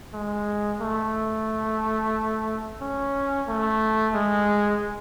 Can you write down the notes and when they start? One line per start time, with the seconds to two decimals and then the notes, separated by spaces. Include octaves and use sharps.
0.14 G#3
0.81 A3
2.81 C#4
3.48 A3
4.15 G#3